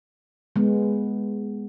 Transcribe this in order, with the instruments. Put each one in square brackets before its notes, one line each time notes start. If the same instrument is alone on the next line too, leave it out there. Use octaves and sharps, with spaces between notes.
[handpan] G#3 B3